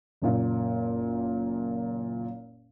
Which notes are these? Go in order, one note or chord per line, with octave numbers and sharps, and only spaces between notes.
F#1 A#2